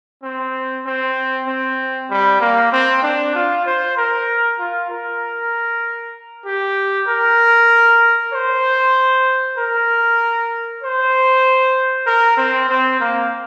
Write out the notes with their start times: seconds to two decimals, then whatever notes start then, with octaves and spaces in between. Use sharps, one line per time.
0.23 C4
0.86 C4
1.47 C4
2.10 G3
2.41 A#3
2.72 C4
3.03 D4
3.35 F4
3.66 C5
3.97 A#4
4.59 F4
4.90 A#4
6.46 G4
7.08 A#4
8.33 C5
9.58 A#4
10.83 C5
12.07 A#4
12.37 C4
12.69 C4
13.00 A#3